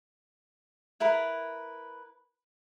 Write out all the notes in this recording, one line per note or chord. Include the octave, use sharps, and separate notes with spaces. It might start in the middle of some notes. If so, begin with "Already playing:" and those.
E4 A#4 B4